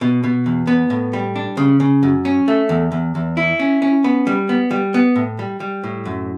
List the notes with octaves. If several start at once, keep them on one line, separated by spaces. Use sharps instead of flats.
B2
B2
E2
B3
A2
G3
D4
C#3
C#3
F#2
C#4
A3
E2
E2
E2
E4
C#4
C#4
B3
G3
B3
G3
B3
A2
G3
G3
A2
F#2